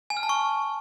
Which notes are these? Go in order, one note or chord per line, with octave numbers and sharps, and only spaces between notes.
G#5
F6
A5
C#6